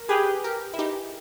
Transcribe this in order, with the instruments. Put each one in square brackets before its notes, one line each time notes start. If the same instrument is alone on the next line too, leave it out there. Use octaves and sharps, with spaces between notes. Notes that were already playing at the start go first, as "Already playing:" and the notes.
Already playing: [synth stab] A#4
[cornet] G4 [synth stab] G#4 B4
[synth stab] G4 A#4
E4
D#4 G4